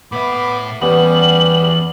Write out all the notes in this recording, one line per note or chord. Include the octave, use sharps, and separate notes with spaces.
A2 B3 E5 B5 D6
E2 G3 B3 C#4 G4 F#5 F#7